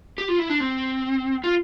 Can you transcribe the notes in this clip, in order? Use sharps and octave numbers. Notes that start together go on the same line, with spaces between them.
G4
F4
E4
D4
C4
F4